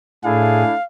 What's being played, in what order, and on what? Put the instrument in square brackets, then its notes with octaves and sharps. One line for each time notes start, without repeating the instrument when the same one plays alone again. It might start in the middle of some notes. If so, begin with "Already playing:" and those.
[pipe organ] A2 G#4 [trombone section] A3 D4 E4 [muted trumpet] F5